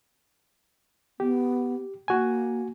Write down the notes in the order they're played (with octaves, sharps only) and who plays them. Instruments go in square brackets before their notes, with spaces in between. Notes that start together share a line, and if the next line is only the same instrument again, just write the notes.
[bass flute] B3 [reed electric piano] G4
[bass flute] A#3 [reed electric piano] F#4 G#5